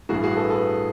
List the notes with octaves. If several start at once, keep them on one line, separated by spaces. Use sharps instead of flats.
A1 G2 E3 F#4 G#4
F#4 G#4
A4 B4
A4 B4